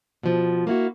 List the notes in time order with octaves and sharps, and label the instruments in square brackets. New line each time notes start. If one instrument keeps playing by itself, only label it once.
[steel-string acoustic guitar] B2 F3
A#3 E4 F#4